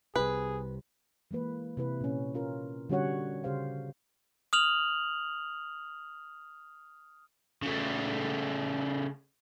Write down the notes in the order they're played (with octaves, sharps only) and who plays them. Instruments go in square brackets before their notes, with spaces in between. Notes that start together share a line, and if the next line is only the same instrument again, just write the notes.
[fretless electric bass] C2 C3 [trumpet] G#4 [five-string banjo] B4
[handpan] E3 G#3 A#3 B4
C3 E4 B4
A#2 C#4
C#4 F4 A#4
D3 G3 C#4 F#4 C#5 F#5
C#3 G4 C5 F5
[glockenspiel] D#6 F6 F7 F#7
[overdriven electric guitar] C#3 A3